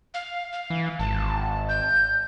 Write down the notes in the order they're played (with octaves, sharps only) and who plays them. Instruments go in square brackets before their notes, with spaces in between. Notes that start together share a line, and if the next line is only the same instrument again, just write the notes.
[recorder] F5
F5
[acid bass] E3
[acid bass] G#1 [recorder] A5
[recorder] G6